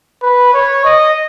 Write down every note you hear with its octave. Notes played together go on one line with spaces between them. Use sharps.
B4
C#5
D#5